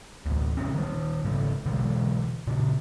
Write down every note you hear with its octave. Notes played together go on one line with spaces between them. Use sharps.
A1 D2
A1 C#3 C4 C#4
D#3 G3
G#2 C#3 G3
B2 D3 E3 G#3
A#2 C#3